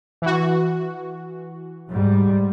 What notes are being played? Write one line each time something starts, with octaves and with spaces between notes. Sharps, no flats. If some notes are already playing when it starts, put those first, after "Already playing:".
E3 F#4
G#2 G3